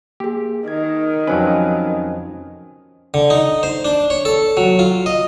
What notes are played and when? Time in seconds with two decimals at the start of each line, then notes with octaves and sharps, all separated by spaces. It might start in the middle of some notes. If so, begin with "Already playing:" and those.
0.20 A#3 G4 G#4
0.68 D#3 G#6
1.27 F2 F#3 C#4 B4 C5 G#5
3.14 D3
3.30 D#4
3.63 C5
3.85 D4
4.10 C#5
4.25 A4
4.57 F#3
4.79 F4
5.06 D#5